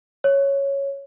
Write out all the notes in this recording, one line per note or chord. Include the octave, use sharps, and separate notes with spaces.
C#5